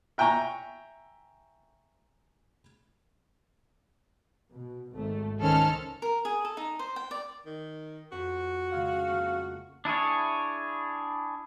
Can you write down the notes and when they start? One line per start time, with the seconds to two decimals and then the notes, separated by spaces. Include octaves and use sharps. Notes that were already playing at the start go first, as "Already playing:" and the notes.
0.18 E5 G5 G#5 A#5 C#6
4.53 B2
4.93 G#1 A3
5.39 C#2 D#3 C#4 A4 C5 F6
6.02 A#4
6.25 G#4
6.45 A4
6.57 D#4
6.79 C5
6.96 G5
7.11 D5
7.46 D#3
8.12 F2 F#4
8.72 C#3 G#3 F5
9.10 A3 A#3
9.85 D4 E4 G#4 C#5